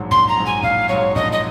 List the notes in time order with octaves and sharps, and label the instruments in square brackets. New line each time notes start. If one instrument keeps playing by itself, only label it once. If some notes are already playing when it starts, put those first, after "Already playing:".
Already playing: [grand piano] A#1 G#2 F#3
[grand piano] A#1 [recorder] C6
[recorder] A#5
[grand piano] G#2 F#3
[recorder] G#5
[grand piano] A#1 [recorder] F5
[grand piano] G#2 F#3 [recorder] C#5
[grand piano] A#1 [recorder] D#5
[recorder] D#5